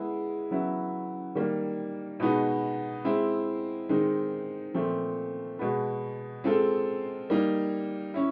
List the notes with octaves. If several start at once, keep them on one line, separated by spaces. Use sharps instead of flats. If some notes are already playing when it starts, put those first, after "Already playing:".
Already playing: G#3 B3 E4 G#4
C#3 F#3 B3 E4
D#3 G3 A#3
B2 G#3 B3 D#4
G#3 C4 E4
D#3 G#3 C4 D#4
A#2 F3 A3 C4
B2 G#3 B3
G#3 C4 F4 A4
G3 A#3 D#4
C#4 E4